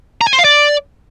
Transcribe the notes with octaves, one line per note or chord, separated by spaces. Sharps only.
A#5
G#5
C5
F5
D5